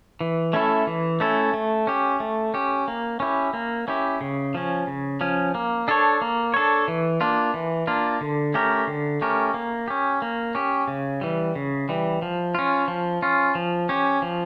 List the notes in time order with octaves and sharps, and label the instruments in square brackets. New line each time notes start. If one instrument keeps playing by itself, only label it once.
[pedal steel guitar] E3
A3 C#4 E4 A4
E3
A3 C#4 E4 A4
A3
C#4 G4
A3
C#4 G4
A#3
C#4 E4 G4
A#3
C#4 E4 G4
C#3
F3 C#4
C#3
F3 C#4
A#3
D4 A4 C#5
A#3
D4 A4 C#5
E3
A#3 D4 F4
E3
A#3 D4 F4
D3
A3 C#4 G4 A#4
D3
A3 C#4 G4 A#4
A#3
C#4 G4
A#3
C#4 G4
C#3
E3 G3
C#3
E3 G3
F3
C#4 F4
F3
C#4 F4
F3
C#4 G4
F3